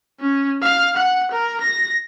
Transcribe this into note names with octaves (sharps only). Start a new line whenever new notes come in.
C#4
F5
F#5
A#4
A#6